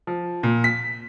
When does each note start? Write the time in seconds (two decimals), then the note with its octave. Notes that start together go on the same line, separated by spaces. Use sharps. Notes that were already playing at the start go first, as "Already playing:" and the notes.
0.07 F3
0.43 A#2
0.64 B6